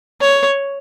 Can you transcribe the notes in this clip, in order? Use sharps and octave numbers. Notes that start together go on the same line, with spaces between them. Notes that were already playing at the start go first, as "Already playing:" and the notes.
C#5